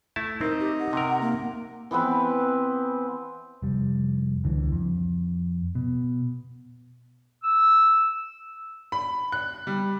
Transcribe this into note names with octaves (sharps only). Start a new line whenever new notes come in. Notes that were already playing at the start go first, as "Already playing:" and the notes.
A3 E4 A5
C4 D#4 A#4
G4
F#5
C3 A#4
A#3
E3 B3 C4 B4
F1 G3
C#2 D3 E3
F2
B2
E6
B5
F#6
G3